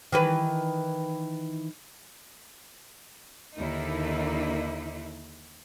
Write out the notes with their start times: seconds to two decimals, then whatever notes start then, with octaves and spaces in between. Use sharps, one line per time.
0.12 D#3 E3 B4
3.57 D#2 D3 A#3 D#4 E4